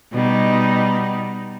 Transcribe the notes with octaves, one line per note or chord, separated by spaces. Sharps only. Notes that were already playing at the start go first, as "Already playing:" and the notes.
B2 G3 D#4